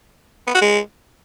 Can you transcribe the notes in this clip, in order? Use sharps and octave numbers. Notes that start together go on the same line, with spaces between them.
B3
F#4
G#3